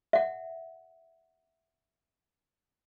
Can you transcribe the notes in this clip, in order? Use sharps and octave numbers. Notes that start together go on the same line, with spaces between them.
E5 F#5